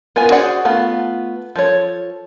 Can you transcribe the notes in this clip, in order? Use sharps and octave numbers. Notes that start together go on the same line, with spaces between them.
B3 F4 A#4 G#5
F#4 G#4 C5 D5 F#5
A3 B3 F4
F3 A4 C#5